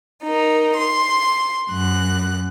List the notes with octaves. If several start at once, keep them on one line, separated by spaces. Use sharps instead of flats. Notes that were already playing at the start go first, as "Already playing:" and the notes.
D#4 A#4
C6
F#2 F#6